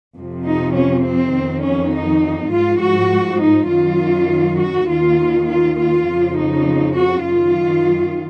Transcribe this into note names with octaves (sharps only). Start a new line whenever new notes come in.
F2 C3 F3
D#4
C#4
C4
F2 D#3
C#4
D#4
G#2 F3 F4
F#4
D#4
F#2 D#3 F4
F#4
D#2 D#3 F4
F4
F4
F2 C#3 F3
D#4
F#4
F#2 D#3 F4